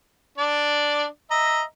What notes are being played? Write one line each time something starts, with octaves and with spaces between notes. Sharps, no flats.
D4 D5
D#5 E5 A#5